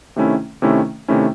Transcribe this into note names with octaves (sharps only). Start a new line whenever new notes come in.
C3 D#3 A3 C#4 E4
C3 D#3 A3 C#4 E4
C3 D#3 A3 C#4 E4